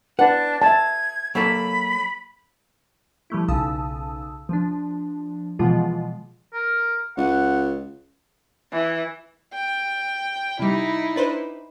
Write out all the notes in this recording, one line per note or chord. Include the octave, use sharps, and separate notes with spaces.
D4 B4 F#5
E5 A5 G#6
F#3 A#3 A4 B5
F3 G3 A3 E4
B1 C#3 A5 D#6 E6
F3 D4
B2 E3 F3 G#3 F4
A#4
C#2 F#5
E3
G5
C3 G3 D#4 E4
D4 B4 C5